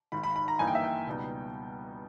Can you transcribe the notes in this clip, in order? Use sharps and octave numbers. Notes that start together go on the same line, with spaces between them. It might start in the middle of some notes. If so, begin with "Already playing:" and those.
G#1 G#2 D#3 B5
B5
B5
A#5
G1 G2 E3 A#3 D#4 G#5
G5
E5
G5
C#2 B2 G3 B3 D#4